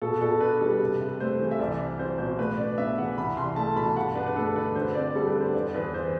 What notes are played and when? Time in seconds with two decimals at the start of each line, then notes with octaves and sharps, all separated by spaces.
0.02 B2 A4
0.21 B2 A4
0.40 D4 B4
0.61 G3
0.80 C3
1.00 C3
1.20 A3 C5
1.40 E3
1.51 E5
1.59 C2 D5
1.78 C4
1.98 F#3 C5
2.18 B2 C5
2.38 A2 B4
2.57 D4 D5
2.78 B3 E5
2.98 E3 F#5
3.17 C2 B5
3.36 C2 C6
3.56 A3 A5
3.76 B2 B5
3.86 A5
3.96 G2 F#5
4.15 D4 B4
4.26 B4
4.36 A3 A4
4.55 D3 B4
4.75 D2 C5
4.95 C4 D5
5.15 G3 A4
5.27 B4
5.35 D3
5.40 C5
5.54 E2 D5
5.74 E2 B4
5.94 E3 C5